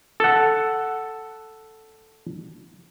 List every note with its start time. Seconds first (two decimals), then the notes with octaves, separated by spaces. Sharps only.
0.20 A4 F#5